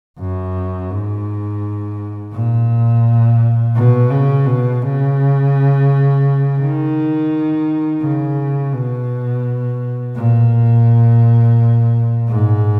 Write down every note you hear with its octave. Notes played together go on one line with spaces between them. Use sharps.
F#2
G#2
A#2
B2
C#3
B2
C#3
D#3
C#3
B2
A#2
G#2